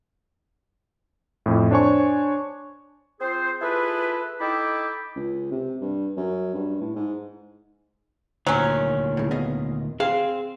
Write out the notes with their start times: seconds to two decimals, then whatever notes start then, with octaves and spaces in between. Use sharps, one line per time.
1.46 F2 A2
1.71 D4 C5 C#5 G#5 C#6
3.21 C4 F4 G#4 C5
3.61 E4 F4 G#4 A4 B4
4.40 D#4 E4 A4 G5 B5 D6
5.16 C#2
5.51 C3
5.81 G2
6.17 F#2
6.55 G2
6.81 A2
6.96 G#2
8.47 D2 A#2 D#3 F#3 C#4
9.17 A2 C#3
9.31 B3 D#5 F5
10.00 C4 G#4 F5